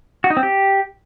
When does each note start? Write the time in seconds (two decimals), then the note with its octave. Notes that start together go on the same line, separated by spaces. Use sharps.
0.24 F#4
0.30 D#4
0.37 C4
0.43 G4